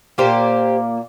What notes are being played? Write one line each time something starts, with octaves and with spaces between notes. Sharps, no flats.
A#2 A#3 G4 C5